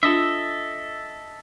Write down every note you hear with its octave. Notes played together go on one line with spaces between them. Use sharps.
D4 F4 A4 D#5 E5